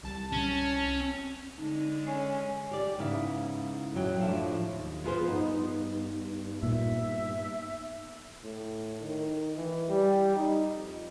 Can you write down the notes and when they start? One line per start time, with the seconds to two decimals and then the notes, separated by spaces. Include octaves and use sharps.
0.03 C2 A5
0.32 C#4
1.58 D3 G#3 D#4
2.07 C#4 G#5 C7
2.72 G4 D5
2.98 G#2 C#3 B3 E4 F5
3.94 F#2 A#2 F#3 G5
4.20 A2 F3 A3 D4 E5 F5
4.72 D#2
5.04 F3 B3 F4 G#4 B4 C5
5.28 G2 B3 D#4
6.63 A#2 E5
8.44 A2
9.01 D#3
9.56 E3
9.89 G3
10.36 D#4
10.75 F2